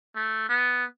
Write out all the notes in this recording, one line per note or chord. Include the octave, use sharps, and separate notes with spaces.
A3
B3